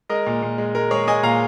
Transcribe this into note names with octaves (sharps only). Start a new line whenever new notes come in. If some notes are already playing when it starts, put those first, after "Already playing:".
G#3 A#4 D#5
A#2
A#2
G#3
G#3 A#4
G#3 G#4 C#5
G#3 D#5 G#5
A#2 F5 A#5